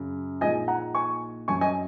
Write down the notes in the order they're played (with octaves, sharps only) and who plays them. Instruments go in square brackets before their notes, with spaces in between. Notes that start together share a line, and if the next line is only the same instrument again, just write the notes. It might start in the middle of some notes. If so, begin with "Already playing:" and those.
Already playing: [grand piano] F#2 C#3
A#1 A#2 G#3 D#4 D#5 G#5
F#5 A#5
G#5 C#6
F#2 F#3 C#4 G#5 C#6
D#5 G#5